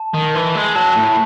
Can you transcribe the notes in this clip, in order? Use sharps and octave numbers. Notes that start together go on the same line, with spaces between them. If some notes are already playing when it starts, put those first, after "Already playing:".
Already playing: A5
D#3
E3
G#3
F#3 A5
A2